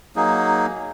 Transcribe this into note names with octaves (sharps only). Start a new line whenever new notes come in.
F#3 A#3 D#4 G#4